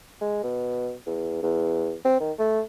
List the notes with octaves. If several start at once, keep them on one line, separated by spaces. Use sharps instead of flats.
G#3
B2
E2
E2
C4
D#3
A3